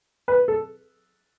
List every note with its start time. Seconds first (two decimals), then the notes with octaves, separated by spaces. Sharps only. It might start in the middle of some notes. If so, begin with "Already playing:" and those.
0.28 B4
0.48 A4